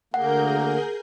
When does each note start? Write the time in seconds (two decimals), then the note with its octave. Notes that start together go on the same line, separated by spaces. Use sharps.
0.14 D2 A#3 G#4 A#4 F#5 G6